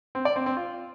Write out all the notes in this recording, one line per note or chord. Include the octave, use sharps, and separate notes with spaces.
C4
D5
C4
C4
F4